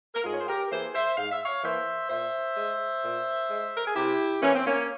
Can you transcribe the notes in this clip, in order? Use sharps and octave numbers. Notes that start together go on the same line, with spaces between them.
A#4
G#2 F4 G#4
C#5
C5
G4 A#4
A#4
E3 A#3 G#4 C5
C5 E5
G#2 F5
E5
C#5 F5
E3 A#3 C5 E5
A#2 C5 E5
G#3
A#2
G#3
A#4
G#4
C3 E4 G4
E3 A#3 C#4
C4
A#3 C#4